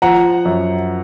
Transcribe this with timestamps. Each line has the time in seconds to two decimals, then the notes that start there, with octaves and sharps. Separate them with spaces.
0.02 F3 F#5 A#5
0.45 F#2